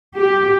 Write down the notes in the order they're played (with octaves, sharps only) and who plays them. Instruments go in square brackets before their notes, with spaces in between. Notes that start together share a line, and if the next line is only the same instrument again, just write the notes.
[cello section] G4